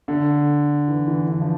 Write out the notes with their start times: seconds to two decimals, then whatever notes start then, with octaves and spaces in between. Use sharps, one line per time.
0.08 D3
0.88 E3
1.07 E3
1.28 D3
1.41 F3